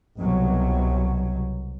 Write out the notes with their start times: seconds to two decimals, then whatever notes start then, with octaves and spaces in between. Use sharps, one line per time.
0.19 C2 B2 F#3